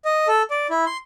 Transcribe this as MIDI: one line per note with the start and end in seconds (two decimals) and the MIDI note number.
0.05 0.27 75
0.28 0.42 69
0.50 0.67 74
0.70 0.85 64
0.86 0.97 84